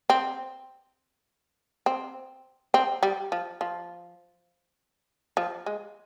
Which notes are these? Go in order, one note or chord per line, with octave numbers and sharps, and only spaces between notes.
C4
C4
C4
G3
F3
F3
F3
G#3